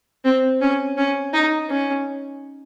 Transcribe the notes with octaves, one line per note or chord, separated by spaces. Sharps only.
C4
C#4
C#4
D#4
C#4